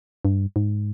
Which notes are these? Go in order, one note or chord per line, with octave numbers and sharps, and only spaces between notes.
G2
G#2